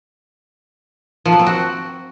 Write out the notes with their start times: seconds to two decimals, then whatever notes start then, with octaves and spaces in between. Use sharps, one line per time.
1.25 F3
1.32 F#3
1.39 C4
1.46 F#4